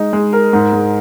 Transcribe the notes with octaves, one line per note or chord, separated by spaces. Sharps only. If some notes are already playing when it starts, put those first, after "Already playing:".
Already playing: G#3 D#4
G#3
A#4
G#2
G#3